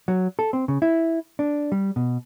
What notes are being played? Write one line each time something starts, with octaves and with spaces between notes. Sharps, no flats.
F#3
A4
C4
C#3
E4
D4
G3
B2